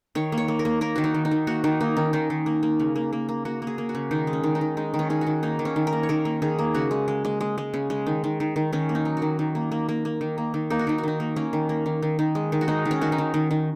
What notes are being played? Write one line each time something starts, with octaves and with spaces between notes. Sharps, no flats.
D#3 C#5
A#3
C#5
A#3
A#4
A#3
A#3 A#4
D#3 F#4
D#4
D#3
D#4
D#3
A#3 F#4
D#3 D#4
A#3 D#4
D#3 C#4
D#3 D#4
D#3
A#3
A#3
C#3
A#3
A#3
A#3
A#3 F#4
A#3
G#4
A#3
F#4
C#3
D#3 D#4
G#3
C#4
D#3
D#4
D#3
G#3 D#4
D#3
C#4
D#3 G#4
F#4
D#3
A#3 D#4
D#3
C#4
D#3
A#4
A#3
C#5
D#3 A#4
A#3
D#3 G#4
A#3
C#3 F#4
G#3
G#3
G#3
G#3
G#3
C#3
G#3
D#3
D#3
D#3
D#3
D#3 C#4
A#3
D#4
F#3
F#4
D#3
D#3
A#3
A#3
A#3
A#3
D#3
A#3
D#3
A#3 D#4
F#4
D#3 D#4
F#4
D#3 D#4
A#3
A#3 C#4
D#3
A#3
D#3
D#3
D#3
G#3
D#3
F#4
G#3 D#4
D#3
C#4
D#3 F#4
D#4
D#3
D#3
D#3